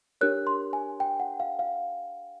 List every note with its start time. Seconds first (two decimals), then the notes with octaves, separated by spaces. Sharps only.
0.21 D4 G4 A#4 C#5 F#6
0.47 C6
0.73 G#5
1.00 G5
1.20 F#5
1.40 F5
1.59 F5